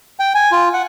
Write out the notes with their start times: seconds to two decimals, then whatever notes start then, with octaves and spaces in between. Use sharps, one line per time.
0.20 G5
0.35 G#5
0.52 F4
0.73 F#5